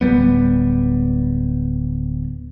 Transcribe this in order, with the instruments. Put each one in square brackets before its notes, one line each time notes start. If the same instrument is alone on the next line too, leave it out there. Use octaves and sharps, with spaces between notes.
[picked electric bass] D1 G#2 G3 B3